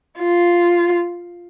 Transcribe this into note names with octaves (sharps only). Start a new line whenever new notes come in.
F4